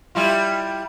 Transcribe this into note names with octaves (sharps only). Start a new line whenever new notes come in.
G3 E4 F4